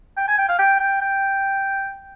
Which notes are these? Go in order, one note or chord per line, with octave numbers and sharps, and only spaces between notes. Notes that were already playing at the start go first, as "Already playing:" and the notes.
G5
G#5
G5
F5
G5
G5
G5